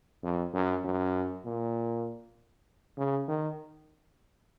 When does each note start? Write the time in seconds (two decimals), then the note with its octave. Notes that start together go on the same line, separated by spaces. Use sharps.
0.23 F2
0.54 F#2
0.84 F#2
1.45 A#2
2.98 C#3
3.28 D#3